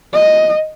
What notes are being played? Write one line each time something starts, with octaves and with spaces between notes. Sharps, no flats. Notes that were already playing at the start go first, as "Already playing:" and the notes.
D#5